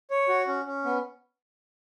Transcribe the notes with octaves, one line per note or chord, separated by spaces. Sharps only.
C#5
F#4
C#4
C#4
B3